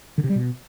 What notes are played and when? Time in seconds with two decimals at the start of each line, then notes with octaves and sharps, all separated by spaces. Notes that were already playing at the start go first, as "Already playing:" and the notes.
0.18 D3
0.24 C3
0.30 G3
0.35 B2